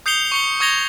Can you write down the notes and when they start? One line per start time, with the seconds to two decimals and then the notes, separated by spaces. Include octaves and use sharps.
0.06 D#6 G6 C7 C#7 F7 G7
0.32 C#6 C#7 G7
0.60 C#6 D#6 G#6 A#6 F7 G7